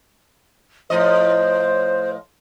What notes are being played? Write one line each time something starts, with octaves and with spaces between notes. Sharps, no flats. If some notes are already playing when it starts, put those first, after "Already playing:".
A2 F3 C5 D#5